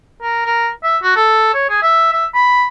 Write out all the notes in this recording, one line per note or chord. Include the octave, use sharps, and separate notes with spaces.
A#4
A#4
E5
F#4
A4
C#5
G#4
E5
E5
B5